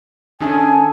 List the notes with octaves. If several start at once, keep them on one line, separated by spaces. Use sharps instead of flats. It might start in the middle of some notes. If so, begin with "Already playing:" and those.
D#3 C#4 D4 G#4 A4 E5 G#5